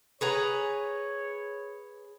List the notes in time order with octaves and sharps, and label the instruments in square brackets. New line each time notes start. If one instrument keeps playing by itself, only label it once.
[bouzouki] G#4 B4 A#5 [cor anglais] C#5